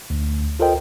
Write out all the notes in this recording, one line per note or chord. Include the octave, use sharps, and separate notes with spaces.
D2
F4 A4 A#4 C5 D#5 G5